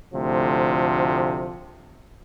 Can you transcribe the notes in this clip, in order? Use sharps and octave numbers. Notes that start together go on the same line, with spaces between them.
D2 A2 C3 F3